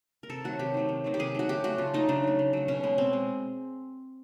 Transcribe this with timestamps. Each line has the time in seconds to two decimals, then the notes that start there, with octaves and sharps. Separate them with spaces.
0.23 A#4
0.29 C3 A4
0.44 D#3 F#3 A3 F#4
0.59 C3 G4
0.74 D#3 F#3 A3
0.89 C3
1.04 D#3 F#3 A3
1.14 G4
1.19 C3 G#4
1.35 D#3 F#3 A3 F#4
1.49 C#3 G4
1.64 F#3 A3 F#4
1.78 C#3 F4
1.94 F#3 A3 D#4
2.09 C#3 D4
2.23 F#3 A3
2.39 C#3
2.53 F#3 A3
2.68 B2 C#4
2.83 G#3 B3
2.98 B2 C4
3.13 G#3